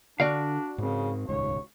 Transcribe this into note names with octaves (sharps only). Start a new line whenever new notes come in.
D3 D4 F#4 D5 F5
G#2 C#3 C4
D#1 C#2 G#2 C#5